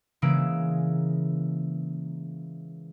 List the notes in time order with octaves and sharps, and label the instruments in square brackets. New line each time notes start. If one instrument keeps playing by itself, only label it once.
[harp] C#3 E3 G#3 A#3 E6 D7